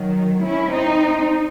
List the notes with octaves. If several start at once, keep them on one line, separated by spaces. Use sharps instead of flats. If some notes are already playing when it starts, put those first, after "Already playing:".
Already playing: D#3 F#3
C#4 E4
C4 D#4